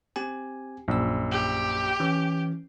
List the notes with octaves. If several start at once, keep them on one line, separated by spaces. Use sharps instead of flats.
C4 G4 G#5
A#1 F#2 E6
G4
E3 C#4